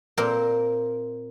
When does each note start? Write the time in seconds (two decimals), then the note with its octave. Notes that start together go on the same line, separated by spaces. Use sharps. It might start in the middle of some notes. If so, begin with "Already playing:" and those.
0.18 A#2 C4 A#4